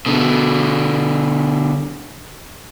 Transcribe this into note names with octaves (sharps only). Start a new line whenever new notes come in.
B2 D3